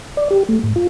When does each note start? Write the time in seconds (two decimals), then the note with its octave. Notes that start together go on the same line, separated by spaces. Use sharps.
0.17 D5
0.30 G4
0.49 A3
0.63 G#2
0.76 F4